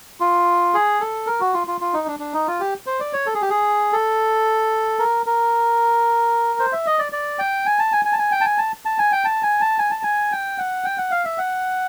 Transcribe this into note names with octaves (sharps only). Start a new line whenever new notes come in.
F4
G#4
A4
A#4
F#4
F4
F4
F4
D#4
D4
D4
D#4
F4
G4
C5
D5
C#5
A4
G#4
G4
G#4
A4
A#4
A#4
C5
E5
D#5
D5
D5
G5
G#5
A5
G#5
G#5
A5
G#5
G5
A5
G#5
A5
A5
G#5
G5
A5
G#5
A5
G#5
A5
G#5
G5
F#5
G5
F#5
F5
E5
F#5